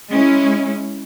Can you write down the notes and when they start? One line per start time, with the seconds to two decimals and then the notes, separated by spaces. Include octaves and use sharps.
0.11 G#3 C#4 E4